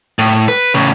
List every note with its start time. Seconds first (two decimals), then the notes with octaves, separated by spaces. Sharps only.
0.19 A2
0.48 B4
0.74 A2 C#3